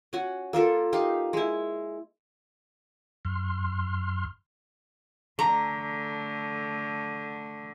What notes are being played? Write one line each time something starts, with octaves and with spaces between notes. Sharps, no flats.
C#4 F#4
A#3 F4 A4 A#4
D#4 G4 F5
G#3 E4
F#2 C6 F6
D3 A3 A#5